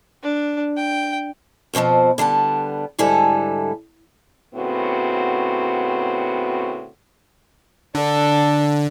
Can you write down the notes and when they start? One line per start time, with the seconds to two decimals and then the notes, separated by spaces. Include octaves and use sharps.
0.23 D4
0.77 G5
1.74 F2 B2 E3 F3 C4
2.18 D3 G3 B3 A5
2.99 G#2 D3 G3 E4 A4 G#5
4.55 A2 C#3 B3 C4 F#4
7.95 D3 D4 A4